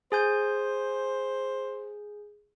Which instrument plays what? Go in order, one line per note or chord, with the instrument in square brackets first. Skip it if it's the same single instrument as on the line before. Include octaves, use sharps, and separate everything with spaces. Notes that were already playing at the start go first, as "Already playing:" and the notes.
[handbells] G#4 G#5 G6 [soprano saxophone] C5